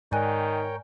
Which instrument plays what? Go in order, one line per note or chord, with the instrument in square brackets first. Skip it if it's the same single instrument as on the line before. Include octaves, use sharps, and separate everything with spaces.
[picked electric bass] G#2 [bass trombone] D#3 [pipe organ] A#4 C#5 G5 [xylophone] D5 G#5 F#6